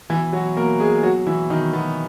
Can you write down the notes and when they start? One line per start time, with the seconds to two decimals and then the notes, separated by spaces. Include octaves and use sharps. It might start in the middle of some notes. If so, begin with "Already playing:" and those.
0.09 B2 E3 E4
0.33 B2 F#3 F#4
0.57 B2 A#3 A#4
0.80 B2 G#3 G#4
1.03 B2 F#3 F#4
1.27 B2 E3 E4
1.50 B2 D#3 D#4
1.73 B2 B3